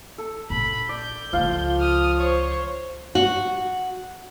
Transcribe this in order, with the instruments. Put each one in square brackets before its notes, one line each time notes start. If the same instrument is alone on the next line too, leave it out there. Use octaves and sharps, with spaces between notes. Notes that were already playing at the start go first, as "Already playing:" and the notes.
[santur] A4
[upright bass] A#1 [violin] B5
[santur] D5 [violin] G6
[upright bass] C#2 C#3 [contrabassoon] F3 [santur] F4 F5
[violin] D#6 F6
C5 C#5
[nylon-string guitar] F#4